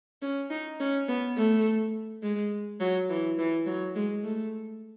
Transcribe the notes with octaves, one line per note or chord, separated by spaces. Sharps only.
C#4
D#4
C#4
B3
A3
G#3
F#3
E3
E3
F#3
G#3
A3